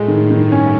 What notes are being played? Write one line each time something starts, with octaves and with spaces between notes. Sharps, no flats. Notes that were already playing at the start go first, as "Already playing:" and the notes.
Already playing: A2 G#3
D#3
G2 D#3
C#4